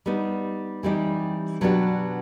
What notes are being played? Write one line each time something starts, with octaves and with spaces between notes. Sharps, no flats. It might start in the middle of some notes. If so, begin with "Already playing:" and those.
G3 B3 D#4
E3 G3 C4 D#4 G4
B2 F#3 B3 D4 G4